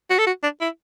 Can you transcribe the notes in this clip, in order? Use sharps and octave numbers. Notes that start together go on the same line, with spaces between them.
F#4
A4
F#4
D4
E4